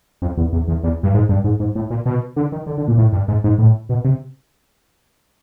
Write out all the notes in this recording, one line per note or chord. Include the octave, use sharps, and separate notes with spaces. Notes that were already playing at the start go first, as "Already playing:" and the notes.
F2
E2
E2
E2
E2
G2
G#2
G2
G#2
G#2
A2
A#2
B2
D3
D#3
D3
D3
A#2
A2
G2
G#2
G#2
A2
B2
C3